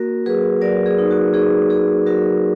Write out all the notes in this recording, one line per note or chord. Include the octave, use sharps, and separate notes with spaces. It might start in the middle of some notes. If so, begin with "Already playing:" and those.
Already playing: A#3 F#4 A#4
F#3 G#4 B4
F#3 A#4 D5
G#4
D#4
F#4
D#4 G#4
F#4 G#4
F#3 F#4 A#4